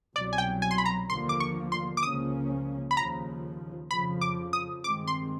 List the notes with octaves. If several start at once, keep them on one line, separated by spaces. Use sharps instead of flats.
C2 B2 F#3 D5
G#5
G5
G#5
C6
B5
A#5
D#2 D3 F3 A#3 C6
D6
C#6
C6
D6
C#2 C#3 F3 A#3 C#4 D#6
B5
D#2 C#3 F3 A#5
F2 C#3 F3 B5
D6
D#6
G2 D#3 G#3 C4 D6
C6